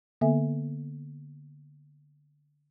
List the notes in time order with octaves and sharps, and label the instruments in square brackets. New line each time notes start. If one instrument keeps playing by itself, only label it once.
[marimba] D3 A#3 B3 A4 E5 G#5